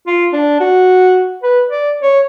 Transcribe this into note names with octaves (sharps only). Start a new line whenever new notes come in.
F4
D4
F#4
B4
D5
C#5